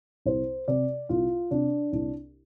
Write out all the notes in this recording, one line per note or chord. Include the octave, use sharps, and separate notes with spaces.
C2 C5
C3 D5
C2 F4
C3 D4
C2 D4